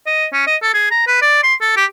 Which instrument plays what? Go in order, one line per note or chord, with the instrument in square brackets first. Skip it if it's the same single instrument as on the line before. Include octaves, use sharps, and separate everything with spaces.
[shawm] D#5
C#4
D#5
A4
G#4
A#5
B4
D5
C6
A4
G4